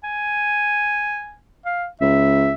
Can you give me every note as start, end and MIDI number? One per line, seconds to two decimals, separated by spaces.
0.03 1.35 80
1.65 1.87 77
2.01 2.53 37
2.01 2.54 76